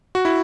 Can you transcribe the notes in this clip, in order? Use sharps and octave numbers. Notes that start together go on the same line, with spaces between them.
F#4
E4